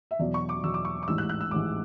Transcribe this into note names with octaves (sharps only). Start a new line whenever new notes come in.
E5
E2 B2 F#3 D5
C#6
D6
E2 B2 F#3 E6
D6
C#6
D6
A1 G#2 E3 E6
F#6
F#6
E6
A1 G#2 E3 D6